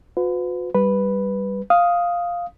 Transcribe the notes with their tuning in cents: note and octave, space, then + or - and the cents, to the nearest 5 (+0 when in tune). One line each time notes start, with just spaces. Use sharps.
F#4 -45 B4 +35
G3 +0 B4 +0
F5 +0 D#6 +5